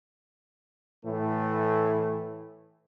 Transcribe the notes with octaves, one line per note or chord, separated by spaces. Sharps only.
A2 E3 A3